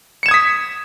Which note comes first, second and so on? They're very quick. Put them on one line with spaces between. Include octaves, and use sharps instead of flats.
C#7 E7 G#6 D#6 B6